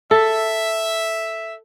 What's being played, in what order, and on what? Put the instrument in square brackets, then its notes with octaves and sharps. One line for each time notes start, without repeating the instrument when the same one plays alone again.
[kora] A4 [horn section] E5